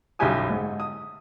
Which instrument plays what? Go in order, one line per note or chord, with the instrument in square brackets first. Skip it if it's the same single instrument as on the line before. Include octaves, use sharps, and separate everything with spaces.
[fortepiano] B1 F#2 G3 G4 G#5 D#6
G#2
D#6